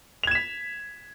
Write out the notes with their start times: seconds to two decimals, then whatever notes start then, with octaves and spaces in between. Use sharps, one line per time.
0.23 F7
0.27 G#6
0.31 E7
0.35 B6